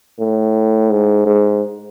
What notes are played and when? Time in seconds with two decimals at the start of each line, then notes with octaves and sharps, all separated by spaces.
0.19 A2
0.90 G#2
1.26 G#2